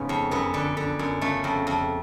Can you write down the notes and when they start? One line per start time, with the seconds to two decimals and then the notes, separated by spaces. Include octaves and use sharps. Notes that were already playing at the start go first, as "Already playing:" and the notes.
Already playing: G#2 C#3 B3 C#4
0.09 F2
0.31 F#2 B3
0.54 D3
0.77 D3
0.99 F#2
1.21 C#3 A3
1.44 F2
1.67 F2